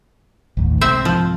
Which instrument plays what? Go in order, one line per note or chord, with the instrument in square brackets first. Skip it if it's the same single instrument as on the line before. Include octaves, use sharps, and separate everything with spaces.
[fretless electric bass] A1 D#2
[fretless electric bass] C2 G#2 [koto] C4 E5
[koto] F3